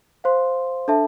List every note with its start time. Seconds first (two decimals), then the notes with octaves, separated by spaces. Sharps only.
0.24 C5 F5 C6
0.88 D4 A4 E5 A5